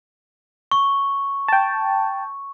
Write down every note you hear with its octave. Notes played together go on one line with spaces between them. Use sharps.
C#6
G5 A5